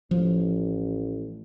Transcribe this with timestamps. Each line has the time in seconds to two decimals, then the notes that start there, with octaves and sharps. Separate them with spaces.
0.11 A1 F3